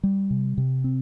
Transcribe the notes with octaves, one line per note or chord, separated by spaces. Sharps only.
G3
C3
C3
C4